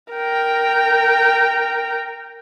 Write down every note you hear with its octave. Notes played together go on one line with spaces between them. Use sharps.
A#4 G5